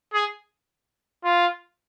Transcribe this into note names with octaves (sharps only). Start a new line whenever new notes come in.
G#4
F4